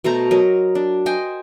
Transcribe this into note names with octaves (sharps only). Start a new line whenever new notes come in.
B2 A3 C5 A#5
F#3 A#4 D#5
D4
C5 D#5 G5 G#5